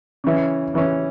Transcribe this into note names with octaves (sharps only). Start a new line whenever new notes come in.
C#3 E3 C#4
C#3 E3 C#4